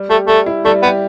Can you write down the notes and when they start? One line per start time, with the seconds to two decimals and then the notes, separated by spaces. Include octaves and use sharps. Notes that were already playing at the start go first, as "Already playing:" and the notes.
Already playing: G3
0.09 A3 G4
0.28 G3 A3
0.46 E4
0.65 G3 A3
0.83 B3 G4